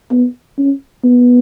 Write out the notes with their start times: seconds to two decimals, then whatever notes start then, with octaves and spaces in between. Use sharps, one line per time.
0.11 B3
0.58 C#4
1.04 B3